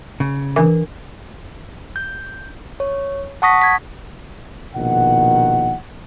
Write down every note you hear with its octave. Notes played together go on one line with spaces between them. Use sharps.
C#3
E3 D4 A#4
G6
C#5
F#5 A5 C#6 D#6 A#6 B6
G#6 B6
A#1 B2 D#3 F#5